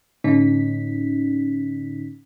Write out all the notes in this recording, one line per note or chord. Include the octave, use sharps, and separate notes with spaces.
A2 D3 C#4 D#4 B6